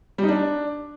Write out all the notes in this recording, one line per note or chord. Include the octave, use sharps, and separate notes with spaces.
G3
D#4
D4